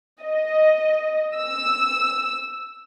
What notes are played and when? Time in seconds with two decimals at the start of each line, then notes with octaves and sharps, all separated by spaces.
0.22 D#5
1.36 E6